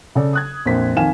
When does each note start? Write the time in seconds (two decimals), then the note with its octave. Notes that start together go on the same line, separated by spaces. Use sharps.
0.15 C#3 A4 D5
0.33 D#6 F#6 G#6
0.65 A#1 F2 A#4 C5 B6
0.96 F2 D#3 F5 G#5 E7